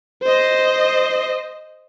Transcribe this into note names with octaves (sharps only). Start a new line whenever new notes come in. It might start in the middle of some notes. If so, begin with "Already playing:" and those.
C5 D#5